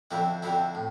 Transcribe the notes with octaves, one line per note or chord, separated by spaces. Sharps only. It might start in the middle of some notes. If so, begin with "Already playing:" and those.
F2 D3 F3 C4 E4
F2 D3 F3 C4 E4
A2